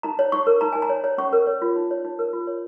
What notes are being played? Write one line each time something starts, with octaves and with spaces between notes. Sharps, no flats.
D#4 A#5
C#5
D#4 C#6
A#4
D#4 A#5
D#4 G#5
A#5
C#5
C#5
C#4 C#6
A#4
C#5
F4
D#4
C#5
D#4
A#4
F4
C#5